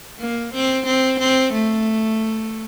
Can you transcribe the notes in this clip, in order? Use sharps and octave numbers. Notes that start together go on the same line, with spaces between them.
A#3
C4
C4
C4
A3